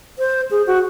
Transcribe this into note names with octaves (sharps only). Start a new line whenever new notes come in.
C5
G#4
F#4